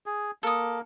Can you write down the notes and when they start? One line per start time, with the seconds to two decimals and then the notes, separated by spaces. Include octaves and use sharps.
0.06 G#4
0.43 A#3 A4 D#6